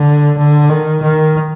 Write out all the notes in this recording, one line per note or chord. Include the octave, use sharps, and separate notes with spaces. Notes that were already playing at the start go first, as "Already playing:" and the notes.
Already playing: D3
D3
D#3
D#3